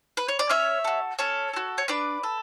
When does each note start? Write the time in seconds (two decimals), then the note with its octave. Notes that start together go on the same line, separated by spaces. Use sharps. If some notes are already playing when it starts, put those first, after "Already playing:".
0.17 B4
0.28 C#5
0.39 D5
0.49 C#4 C#5 E5
0.84 F#4 A4
1.19 C#4 A4 C#5
1.53 F#4 A4
1.78 C#5
1.88 D4 B4 D5
2.23 A4